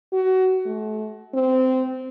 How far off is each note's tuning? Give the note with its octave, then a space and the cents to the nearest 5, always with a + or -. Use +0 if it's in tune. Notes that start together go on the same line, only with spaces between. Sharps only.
F#4 +25
A3 -35
C4 -15